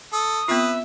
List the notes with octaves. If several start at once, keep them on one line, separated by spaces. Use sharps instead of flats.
A4 D#6
B3 C4 F4 B4 E5